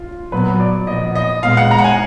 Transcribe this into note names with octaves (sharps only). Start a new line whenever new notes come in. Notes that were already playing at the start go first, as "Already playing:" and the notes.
Already playing: F4
A#2 F#3 B3 B4
D5
A#2 F3 B3 D#5
D#5
A#2 G#3 B3 F5
F#5
A#5
F#5
G#5